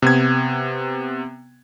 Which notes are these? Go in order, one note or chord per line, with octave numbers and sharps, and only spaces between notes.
C3 B3 G#6